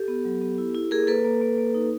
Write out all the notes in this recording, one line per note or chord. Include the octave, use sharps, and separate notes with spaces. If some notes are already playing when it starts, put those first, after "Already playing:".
Already playing: G4 A4
B3
F#3
B3
E4
E4
A#3 G#4 A#4
A#3 A4 B4
A#3
A#3
A#3
D#4